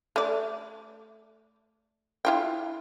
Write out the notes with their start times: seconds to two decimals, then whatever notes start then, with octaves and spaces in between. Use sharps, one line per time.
0.16 A3 D5
2.25 E4 F4 G5